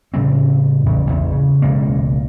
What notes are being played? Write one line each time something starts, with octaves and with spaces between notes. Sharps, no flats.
A2 C#3 G3 C4
A1 E2 C#3
A1 E2
C#3
E1 C#2 A2 A#3